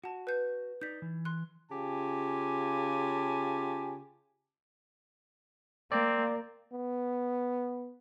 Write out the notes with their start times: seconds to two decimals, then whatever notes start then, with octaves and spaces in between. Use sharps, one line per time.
0.04 F#4 F#5 A5
0.27 B4 G6
0.81 D#4 D5 G6 B6
1.02 E3
1.25 C6 F#6
1.71 C#3 F4 G4 G#5 A5
5.92 A#3 C4 D5
6.73 B3